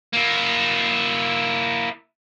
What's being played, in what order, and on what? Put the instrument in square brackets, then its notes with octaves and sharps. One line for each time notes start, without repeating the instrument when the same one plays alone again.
[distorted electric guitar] A#3 E4